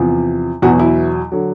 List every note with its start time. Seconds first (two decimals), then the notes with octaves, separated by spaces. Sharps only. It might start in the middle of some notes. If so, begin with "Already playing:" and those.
Already playing: E2 C3 F3
0.62 E2 B2 F#3 F#4
0.79 E4
1.32 D3 F#3